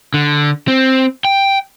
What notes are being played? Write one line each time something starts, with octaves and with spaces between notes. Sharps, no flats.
D3
C4
G5